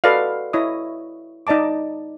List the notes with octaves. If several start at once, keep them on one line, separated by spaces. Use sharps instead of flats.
F#4 A4 B4 D5 D#5 F5
E4 C#5 D#5 D#6
D#4 D5 D#5 A5 D6